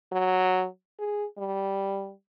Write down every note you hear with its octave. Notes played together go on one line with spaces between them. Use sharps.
F#3
G#4
G3